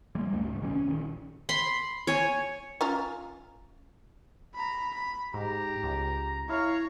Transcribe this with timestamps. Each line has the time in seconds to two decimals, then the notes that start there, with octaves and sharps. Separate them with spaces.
0.15 G3 G#3 A#3
0.32 C#2 F#2 A3
0.46 C#2 G#2
0.62 A#1 C#3 F3 C#4
0.75 C#4
0.89 A#1 D#3
1.49 B5 C6
2.07 C#5 G#5
2.81 C#4 F4 A#5
4.54 A#5 B5
4.94 B5
5.34 G#2 G4 A#5
5.83 C#2
6.49 E4 C#5 F5 A#5